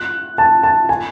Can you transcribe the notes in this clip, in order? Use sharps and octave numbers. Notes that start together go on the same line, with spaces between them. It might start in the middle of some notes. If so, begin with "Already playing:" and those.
Already playing: F#6
A5
A5
G#5